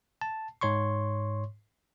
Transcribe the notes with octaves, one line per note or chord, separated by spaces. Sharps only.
A5
G#2 C#5 C6 C#6